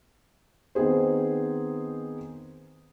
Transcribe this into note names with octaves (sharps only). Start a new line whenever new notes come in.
D#3 B3 C4 G#4 C5